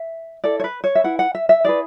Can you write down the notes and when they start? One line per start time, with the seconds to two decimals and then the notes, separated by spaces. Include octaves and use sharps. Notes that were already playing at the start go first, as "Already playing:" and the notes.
Already playing: E5
0.44 E4 A4 D5
0.60 C#5
0.64 B4
0.84 C#5
0.95 E5
1.04 E4 B4 F#5
1.19 F#5
1.35 E5
1.49 E5
1.65 E4 G#4 B4 D5